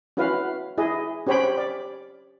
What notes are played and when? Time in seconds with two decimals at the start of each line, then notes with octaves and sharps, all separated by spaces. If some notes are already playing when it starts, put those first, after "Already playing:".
0.17 C#4 E4 F#4 B4 F5
0.78 E4 G#4 D#5
1.27 C#4 G4 C5 C#5 G5 B5
1.58 D5